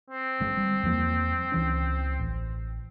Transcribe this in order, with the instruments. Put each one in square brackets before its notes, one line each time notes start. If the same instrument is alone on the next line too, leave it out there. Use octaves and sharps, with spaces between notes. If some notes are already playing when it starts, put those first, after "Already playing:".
[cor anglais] C4
[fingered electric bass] G1 D3 G#3
G3
E2 F3 A#3
C#2 E3 C#4
A1